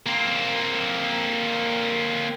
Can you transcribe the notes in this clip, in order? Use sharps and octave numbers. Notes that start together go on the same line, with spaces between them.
A#3 C4